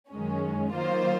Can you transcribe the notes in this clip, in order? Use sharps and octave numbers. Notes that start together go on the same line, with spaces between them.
F#2 D#3 G#3 C#4
D#3 F#3 A#3 F4 C5